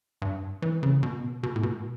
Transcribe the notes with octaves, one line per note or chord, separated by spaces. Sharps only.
G2
E3
C#3
B2
B2
A2
B2